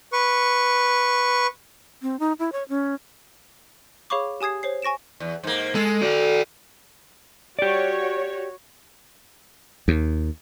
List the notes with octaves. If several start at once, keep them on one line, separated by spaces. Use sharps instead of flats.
B4 C#6
C4
D#4
E4
C#5
C#4
G#4 C#5 F5 B5 C#6 D6
G4 G#5 D#6 G#6 C7
C5 C#5 C7
G#5 C#6 A#6 D7 E7
E2
G#2 A#3
G#3 A4
F#4 D5
F#4 G4 C#5 D5
D#2